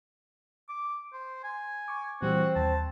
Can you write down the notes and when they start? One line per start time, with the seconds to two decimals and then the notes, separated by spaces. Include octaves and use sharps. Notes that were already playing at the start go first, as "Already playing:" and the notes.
0.69 D6
1.13 C5
1.44 G#5
1.88 C#6 D6
2.22 A#2 E3 G3 C4 F#4
2.56 D#2 A5